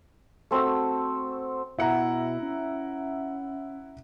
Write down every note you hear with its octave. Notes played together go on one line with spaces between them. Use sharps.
A3 C4 F#4 E6
B2 E4 E5 F#5 A#5
C#4